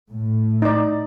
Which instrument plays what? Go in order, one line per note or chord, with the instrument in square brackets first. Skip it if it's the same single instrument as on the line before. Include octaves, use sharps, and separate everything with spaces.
[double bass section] A2
[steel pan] D#4 D5